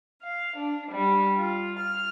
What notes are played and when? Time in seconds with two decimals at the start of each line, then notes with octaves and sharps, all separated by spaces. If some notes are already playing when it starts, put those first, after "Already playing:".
0.22 F5
0.56 D4
0.90 G3
1.37 F4
1.78 F6